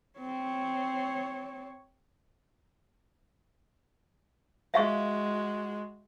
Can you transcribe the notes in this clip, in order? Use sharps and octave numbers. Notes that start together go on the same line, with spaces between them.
C4 C#5
G#3 F#4 E5 F5 C#6